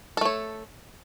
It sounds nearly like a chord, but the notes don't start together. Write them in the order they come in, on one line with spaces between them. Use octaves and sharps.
A4 A3 C#5